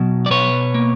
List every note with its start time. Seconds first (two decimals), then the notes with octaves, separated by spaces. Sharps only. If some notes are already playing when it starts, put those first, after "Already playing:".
Already playing: B2 F#3
0.26 D5
0.30 B2 B4 C#5
0.74 A#3